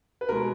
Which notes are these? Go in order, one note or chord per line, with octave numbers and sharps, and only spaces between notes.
B4
B2 G#3 A#4